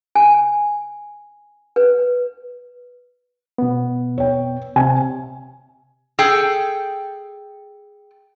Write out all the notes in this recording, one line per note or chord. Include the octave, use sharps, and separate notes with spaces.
G#5
B4
B2 B3
C#5 G5
C3 G#5
G#4 A4 G5